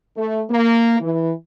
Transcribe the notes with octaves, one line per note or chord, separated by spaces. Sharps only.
A3
A#3
E3